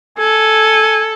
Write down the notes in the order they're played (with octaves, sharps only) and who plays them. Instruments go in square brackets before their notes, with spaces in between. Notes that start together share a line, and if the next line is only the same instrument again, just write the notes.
[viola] A4 [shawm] G#5